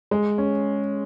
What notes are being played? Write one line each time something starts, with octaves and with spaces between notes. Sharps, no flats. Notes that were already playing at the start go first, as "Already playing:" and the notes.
G#3
C#4